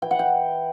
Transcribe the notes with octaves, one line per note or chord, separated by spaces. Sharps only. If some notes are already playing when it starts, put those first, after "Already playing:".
E3 G5
F#5
G5